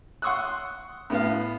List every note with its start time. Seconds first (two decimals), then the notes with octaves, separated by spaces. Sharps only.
0.22 F#5 C6 C#6 D#6 E6 F#6
1.10 A2 B3 F5